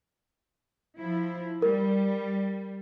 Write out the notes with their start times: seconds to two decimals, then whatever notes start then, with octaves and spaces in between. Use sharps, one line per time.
0.97 F3 E4
1.62 G3 A#4